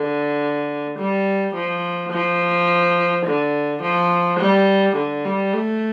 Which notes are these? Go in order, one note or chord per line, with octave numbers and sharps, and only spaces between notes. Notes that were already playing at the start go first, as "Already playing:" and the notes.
Already playing: D3
G3
F3
F3
D3
F3
G3
D3
G3
A3